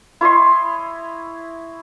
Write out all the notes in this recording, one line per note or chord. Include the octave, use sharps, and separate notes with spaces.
E4 C#5 D#5 C6